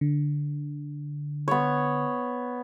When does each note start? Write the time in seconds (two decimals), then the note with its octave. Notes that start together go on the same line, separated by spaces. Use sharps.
0.01 D3
1.48 B3 C#5